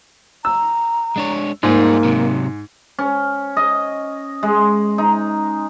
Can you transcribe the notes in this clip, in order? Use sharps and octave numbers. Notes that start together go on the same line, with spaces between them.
A#5 E6
G#3 D4 C#5
G#2 G3 A#3 F4 G#4
C3 F#3
C#4
D#5
G#3
D#4